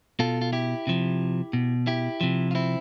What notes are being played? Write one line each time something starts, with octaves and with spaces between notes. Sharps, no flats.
B2 F4 A4
F4
E4 G4
C3 F3
B2
E4 G4
C3 F3
F4
C4 E4